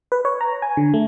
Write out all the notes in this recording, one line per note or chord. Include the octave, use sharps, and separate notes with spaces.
B4
C#5
A#5
G#5
D3
A3